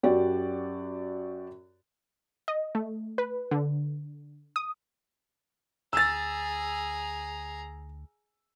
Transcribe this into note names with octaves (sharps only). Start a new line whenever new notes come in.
F#2 F#4 G4 D5
D#5
A3
B4
D3
D#6
D2 G#4 A#5 E6 A6